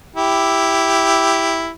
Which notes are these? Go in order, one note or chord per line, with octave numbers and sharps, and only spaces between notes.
E4 G4